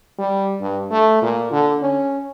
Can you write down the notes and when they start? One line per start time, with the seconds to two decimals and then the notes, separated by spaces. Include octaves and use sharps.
0.18 G3
0.61 G2
0.90 A3
1.22 A#2
1.51 D3
1.82 C#4